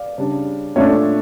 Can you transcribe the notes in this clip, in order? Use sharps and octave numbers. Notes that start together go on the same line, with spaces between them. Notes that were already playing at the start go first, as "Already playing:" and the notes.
Already playing: D5 F5
C#3 G3 D4
A#2 A3 D4 C#5 E5